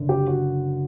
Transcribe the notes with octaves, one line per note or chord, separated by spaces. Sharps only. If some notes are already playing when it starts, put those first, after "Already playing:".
Already playing: F#1 D3
G4
F#4